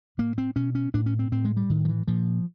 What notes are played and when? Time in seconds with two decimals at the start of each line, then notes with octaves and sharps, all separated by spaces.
0.18 A2 A#3
0.38 C4
0.56 B2 C#4
0.75 C#4
0.94 A2 D4
1.06 C#4
1.19 C4
1.32 A2 C4
1.45 G#3
1.57 G3
1.70 A2 D#3
1.85 F3
1.89 E3
2.07 A#2 F3